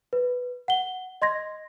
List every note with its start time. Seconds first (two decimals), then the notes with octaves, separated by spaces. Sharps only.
0.13 B4
0.68 F#5 G7
1.22 D#5 C6 G#6 A#6